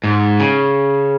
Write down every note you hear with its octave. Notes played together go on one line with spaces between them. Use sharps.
G#2
C#3